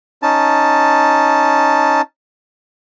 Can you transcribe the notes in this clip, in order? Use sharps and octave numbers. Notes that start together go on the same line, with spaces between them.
C#4 D#4 A5